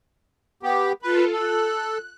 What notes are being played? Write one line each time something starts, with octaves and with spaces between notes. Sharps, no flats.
B3 G4
F4 A4 B4
A4 F#6